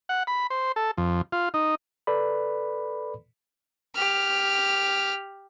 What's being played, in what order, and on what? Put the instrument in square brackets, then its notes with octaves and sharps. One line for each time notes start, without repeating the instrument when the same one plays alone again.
[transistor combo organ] F#5
B5
C5
A4
F2
F4
D#4
[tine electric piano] A4 B4 D5 B5
[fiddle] G4 F6